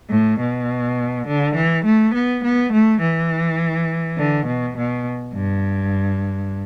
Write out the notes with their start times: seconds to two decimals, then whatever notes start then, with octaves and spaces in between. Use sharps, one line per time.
0.10 A2
0.40 B2
1.27 D3
1.56 E3
1.85 A3
2.15 B3
2.43 B3
2.72 A3
3.02 E3
4.17 D3
4.47 B2
4.77 B2
5.34 G2